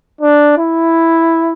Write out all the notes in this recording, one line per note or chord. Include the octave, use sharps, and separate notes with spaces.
D4
E4